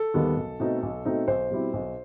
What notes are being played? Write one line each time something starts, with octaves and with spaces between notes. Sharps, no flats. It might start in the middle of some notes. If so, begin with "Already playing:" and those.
Already playing: A4
D#2 D#3 G3 B3
B1
B2 A3 C4 D#4
B1
B2 A3 C4 D#4
B1 C5
B2 G3 C4 E4
B1